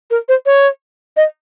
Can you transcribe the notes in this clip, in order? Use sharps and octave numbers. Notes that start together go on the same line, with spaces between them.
A#4
C5
C#5
D#5